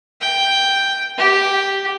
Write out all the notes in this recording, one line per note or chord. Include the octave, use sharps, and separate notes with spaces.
G5
G4